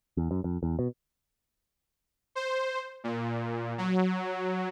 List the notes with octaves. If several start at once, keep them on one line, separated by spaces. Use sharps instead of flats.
E2
F#2
F2
E2
B2
C5
A#2
F#3